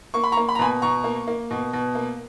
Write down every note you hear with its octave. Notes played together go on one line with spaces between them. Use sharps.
A#3 C#6
B5
A#5 C#6
A#3
B5
A#5
B2 G#5 B5
B2 A#5 C#6
A#3
A#3
B2
B2
A#3